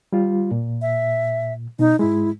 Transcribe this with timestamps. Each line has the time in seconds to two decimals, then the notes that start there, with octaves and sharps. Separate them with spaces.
0.13 G3 F4
0.51 A#2
0.82 E5
1.79 B2 D#4
1.99 G#2 G#3 E4